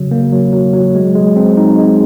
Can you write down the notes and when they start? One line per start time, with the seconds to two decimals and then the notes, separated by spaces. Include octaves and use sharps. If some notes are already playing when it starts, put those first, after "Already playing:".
Already playing: C#3 F#3
0.11 A#3
0.32 F#3
0.53 F#3
0.74 F#3
0.95 G#3
1.16 G#3
1.36 C4
1.57 D#4
1.78 G#3